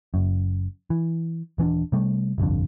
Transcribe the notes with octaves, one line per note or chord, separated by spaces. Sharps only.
F#1 F#2
E3
D#1 E3 C#4 D4
C3 G3 A3
G1 C2 F2 D3